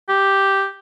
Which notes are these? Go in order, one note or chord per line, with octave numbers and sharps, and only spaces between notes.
G4